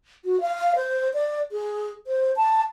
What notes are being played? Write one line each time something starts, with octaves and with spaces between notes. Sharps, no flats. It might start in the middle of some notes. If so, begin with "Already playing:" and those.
F#4
F5
C5
D5
G#4
C5
A5